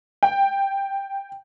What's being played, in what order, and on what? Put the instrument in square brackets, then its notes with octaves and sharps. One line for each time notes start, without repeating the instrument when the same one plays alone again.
[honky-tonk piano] G5